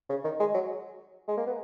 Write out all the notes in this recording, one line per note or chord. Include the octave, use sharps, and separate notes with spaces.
C#3
D#3
G#3
F#3
G#3
A#3
B3